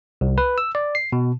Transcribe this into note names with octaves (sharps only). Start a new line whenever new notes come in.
C2
B4
E6
D5
C7
B2